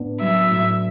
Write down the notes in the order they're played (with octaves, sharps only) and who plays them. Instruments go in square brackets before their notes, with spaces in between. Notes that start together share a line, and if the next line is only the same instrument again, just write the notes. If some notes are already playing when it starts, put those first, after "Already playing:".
Already playing: [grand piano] A2 B3 D4
[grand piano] F#3 [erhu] E5
[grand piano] A2